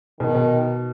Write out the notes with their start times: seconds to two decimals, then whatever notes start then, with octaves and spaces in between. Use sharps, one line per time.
0.20 B2 D#3
0.35 B2